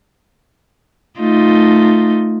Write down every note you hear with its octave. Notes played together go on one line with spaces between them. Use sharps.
A3 D#4 F4